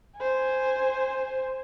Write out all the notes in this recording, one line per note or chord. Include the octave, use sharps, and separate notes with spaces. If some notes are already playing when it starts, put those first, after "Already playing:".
C5 G#5